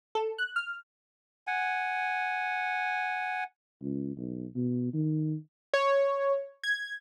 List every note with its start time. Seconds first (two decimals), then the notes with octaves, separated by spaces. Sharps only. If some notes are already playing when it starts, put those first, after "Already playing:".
0.15 A4
0.38 F#6
0.56 F6
1.47 F#5 G#5
3.82 C#2
4.17 B1
4.56 B2
4.94 D#3
5.74 C#5
6.64 G#6